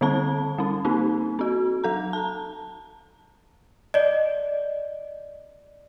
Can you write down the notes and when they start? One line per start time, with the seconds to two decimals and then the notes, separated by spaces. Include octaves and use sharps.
0.01 D3 G3 C4 A5
0.58 G3 C#4
0.85 A#3 C4 D#4
1.39 C4 F#4
1.84 F#3 A4 A#5
2.13 A5 A#5
3.94 D5 D#5